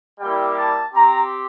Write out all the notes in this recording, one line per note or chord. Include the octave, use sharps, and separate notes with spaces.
G3 A#3 E4 G4 G5
A5
C4 G4 A#5